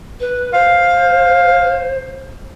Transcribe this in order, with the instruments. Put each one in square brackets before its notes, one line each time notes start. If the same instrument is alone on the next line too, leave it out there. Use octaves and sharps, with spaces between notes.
[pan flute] B4
[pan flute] C5 [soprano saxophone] F5